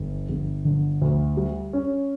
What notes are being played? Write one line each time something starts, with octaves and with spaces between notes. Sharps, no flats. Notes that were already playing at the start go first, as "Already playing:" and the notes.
Already playing: G1
G1
D3
D2
G3
C#4